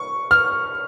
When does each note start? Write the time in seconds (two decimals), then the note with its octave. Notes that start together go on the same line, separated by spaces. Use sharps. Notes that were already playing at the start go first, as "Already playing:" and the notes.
Already playing: C#6
0.31 F6